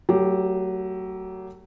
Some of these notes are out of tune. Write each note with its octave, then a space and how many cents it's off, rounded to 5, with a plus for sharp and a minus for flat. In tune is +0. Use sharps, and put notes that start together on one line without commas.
F#3 +25 A3 +35 G4 +0